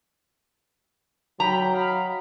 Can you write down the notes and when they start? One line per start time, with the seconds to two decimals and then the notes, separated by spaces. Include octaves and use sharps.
1.40 F#3 G3 G5 A#5 B5
1.73 D#5 F5 B5